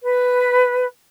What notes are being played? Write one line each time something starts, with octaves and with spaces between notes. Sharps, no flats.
B4